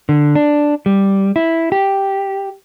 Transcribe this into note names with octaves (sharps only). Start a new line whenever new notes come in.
D3
D4
G3
E4
G4